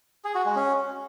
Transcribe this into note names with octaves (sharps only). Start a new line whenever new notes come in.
G#4
F#4
G#3
C#4